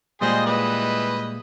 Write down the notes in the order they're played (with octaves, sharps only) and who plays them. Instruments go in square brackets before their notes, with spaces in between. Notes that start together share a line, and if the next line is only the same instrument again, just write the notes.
[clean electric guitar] A#2 G3 G#3 [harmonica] G#4 C5 D#5
[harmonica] E3 B4 D#5